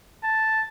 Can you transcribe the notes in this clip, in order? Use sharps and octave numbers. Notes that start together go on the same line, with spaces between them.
A5